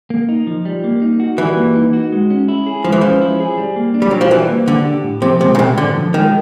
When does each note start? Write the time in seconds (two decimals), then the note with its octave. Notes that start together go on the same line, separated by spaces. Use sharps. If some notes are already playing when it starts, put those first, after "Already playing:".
0.10 A#3
0.29 D#4
0.47 F3
0.65 G3
0.84 A#3
1.02 D#4
1.20 F#4
1.38 E3 G3
1.56 A#3
1.75 D#4
1.93 F#4
2.12 G#3
2.30 C#4
2.48 E4
2.66 G#4
2.84 F3 G#3
2.92 E3
3.01 F3 C#4
3.21 E4
3.40 G#4
3.58 G3
3.76 A#3
3.94 D4
4.02 G3
4.11 F#3 G4
4.21 F3
4.31 E3 G3
4.49 A#3
4.68 D3 D4
4.85 G4
5.04 A2
5.22 C3 F3
5.41 C3 G#3
5.55 C#3
5.59 C3 B3
5.77 A2 D3
5.95 F3
6.14 D#3 G#3